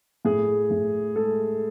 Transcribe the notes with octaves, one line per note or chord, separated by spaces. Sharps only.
A2 G#4
A2
G#3 A4